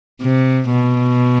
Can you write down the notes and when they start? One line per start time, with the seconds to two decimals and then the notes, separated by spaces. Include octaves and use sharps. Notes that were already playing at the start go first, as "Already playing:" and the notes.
0.21 C3
0.72 B2